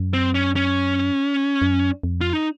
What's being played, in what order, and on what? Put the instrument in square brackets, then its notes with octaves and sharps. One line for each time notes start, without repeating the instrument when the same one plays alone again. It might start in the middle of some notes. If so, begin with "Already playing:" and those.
Already playing: [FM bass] F#2
[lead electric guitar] C4
C#4
C#4
[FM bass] F#2
F2
[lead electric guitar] F4
D#4